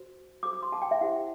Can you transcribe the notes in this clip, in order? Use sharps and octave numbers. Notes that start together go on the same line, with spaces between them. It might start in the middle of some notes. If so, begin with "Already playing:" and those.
Already playing: F#4 C5
F#4 A4 C5 D6
D6
C6
A5
G5
E5
E4 G4 C5 F#5